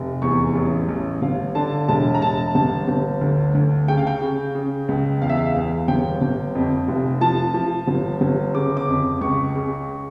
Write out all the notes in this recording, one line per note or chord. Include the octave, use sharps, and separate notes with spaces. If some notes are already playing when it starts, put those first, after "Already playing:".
Already playing: F1
E2 C#6
A1
A1
G1 F5
D3 A5
E1 A5
A#5
E1 A5
G1 A5
G1
D2
D2
C#3 G5
F5
G5
C#3
C#3
C#2
E2 F5
E5
F5
E2 F5
G1 G5
G1
F2
F1
F3 A5
F3
G1
G1
C#3 D6
D6
F2
C#2 C#6
C#3